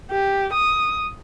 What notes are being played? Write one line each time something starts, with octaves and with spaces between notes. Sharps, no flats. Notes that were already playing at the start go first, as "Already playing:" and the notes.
G4
D#6